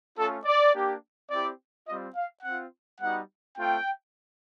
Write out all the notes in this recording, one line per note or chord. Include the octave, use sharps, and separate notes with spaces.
A3 C#4 F4 A4
D5
A#3 D4 G4
C4 E4 G4 D5
G3 C4 F4 D#5
F5
C4 F4 F#5
G3 B3 D#4 F#4 F#5
A3 C4 F4 G5